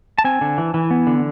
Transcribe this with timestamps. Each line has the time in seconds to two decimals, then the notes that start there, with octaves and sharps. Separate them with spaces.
0.18 A5
0.24 C4 G#5
0.41 D3
0.58 E3
0.74 E3
0.91 B3
1.07 D3